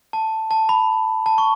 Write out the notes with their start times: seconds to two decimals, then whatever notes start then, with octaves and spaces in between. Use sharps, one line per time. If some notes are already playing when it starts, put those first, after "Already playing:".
0.13 A5
0.51 A5
0.69 B5
1.26 A5
1.38 C#6